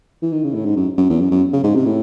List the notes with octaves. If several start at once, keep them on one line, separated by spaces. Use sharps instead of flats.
E3
D#3
C#3
A2
G#2
F#2
F#2
E2
F#2
F#2
C#3
G#2
C3
A2